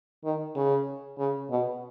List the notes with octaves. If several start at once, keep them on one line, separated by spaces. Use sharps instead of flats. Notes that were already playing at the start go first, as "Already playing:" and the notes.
D#3
C#3
C#3
B2